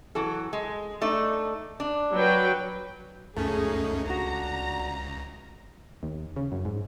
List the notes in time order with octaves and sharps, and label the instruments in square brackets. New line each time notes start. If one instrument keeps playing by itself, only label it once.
[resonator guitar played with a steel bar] E3 F#3 A4
G#3
A3 D4 D#4
D4
[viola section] F#3 B4 G5
[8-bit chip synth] C#2 F#2 C#4 [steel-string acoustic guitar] A3 [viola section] D#4 G#4
[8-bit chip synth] C#2 [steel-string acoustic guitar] D4 F#4 [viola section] A#5
[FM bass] D#2
C#3
F#2
G#2